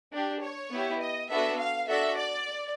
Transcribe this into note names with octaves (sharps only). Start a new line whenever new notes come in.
D4 G4
C#5
B3 E4 G4
D#5
B3 D4 F#4 A4 E5
F5
D4 F#4 A4 E5
D5